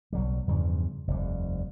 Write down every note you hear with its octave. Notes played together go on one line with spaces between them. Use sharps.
B1 F#3 G3
E2 G2 C#3 F3
F1 D#2 G3